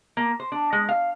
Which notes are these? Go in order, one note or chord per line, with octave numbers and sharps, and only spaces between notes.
A#3
C5
D4
G#3
F5